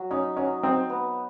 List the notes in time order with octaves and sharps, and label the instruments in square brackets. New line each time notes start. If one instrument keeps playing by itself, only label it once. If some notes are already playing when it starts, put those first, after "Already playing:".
Already playing: [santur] F#3
[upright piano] C#4 [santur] D#4
[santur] F#3 [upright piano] C#4
[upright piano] C4 [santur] D#4
[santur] B3